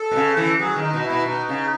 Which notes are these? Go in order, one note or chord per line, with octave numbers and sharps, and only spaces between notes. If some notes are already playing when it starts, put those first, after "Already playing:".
Already playing: A4
B2
C#3
E3
F#3 G#4
D#3
D#4
B2
E4
B2
B2 D#4
C#3